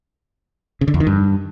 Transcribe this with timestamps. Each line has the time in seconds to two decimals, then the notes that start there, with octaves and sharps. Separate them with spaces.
0.81 C#3
0.88 D3
0.94 E2
1.00 D#3
1.07 G2